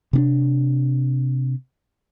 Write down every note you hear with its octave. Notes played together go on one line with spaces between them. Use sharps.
C3 C#4 D4